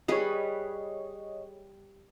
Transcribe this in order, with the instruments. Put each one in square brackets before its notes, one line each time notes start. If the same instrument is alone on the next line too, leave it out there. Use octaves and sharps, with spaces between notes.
[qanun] G3 G#4 B4 [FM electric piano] C#5 D#5